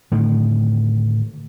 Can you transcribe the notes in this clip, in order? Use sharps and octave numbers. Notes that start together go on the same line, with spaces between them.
A2 D3 D#3